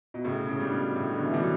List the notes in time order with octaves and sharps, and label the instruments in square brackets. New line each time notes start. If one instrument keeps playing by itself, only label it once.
[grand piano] B2
[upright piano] A2 [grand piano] C#3
[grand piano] C#3
[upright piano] G3 D4
[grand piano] B2
[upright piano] A2 [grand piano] C#3
[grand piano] B2 D3
E3
[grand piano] D3 F#3 [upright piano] G3 D4